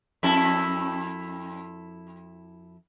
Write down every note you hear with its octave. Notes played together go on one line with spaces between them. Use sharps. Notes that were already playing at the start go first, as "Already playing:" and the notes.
F2 E4 A4